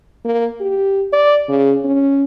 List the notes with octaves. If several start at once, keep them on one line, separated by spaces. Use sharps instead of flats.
A#3
G4
D5
C#3
C#4